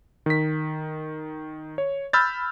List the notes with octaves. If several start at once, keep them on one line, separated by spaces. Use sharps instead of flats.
D#3 B6
C#5
B5 E6 F6 G6 A6